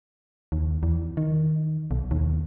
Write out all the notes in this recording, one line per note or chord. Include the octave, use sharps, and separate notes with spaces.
D#2
E2
D#3
B1
D#2